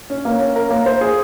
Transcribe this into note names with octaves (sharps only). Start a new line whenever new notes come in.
C#4
A#3
C#4
A#4
A#3
C5
G#4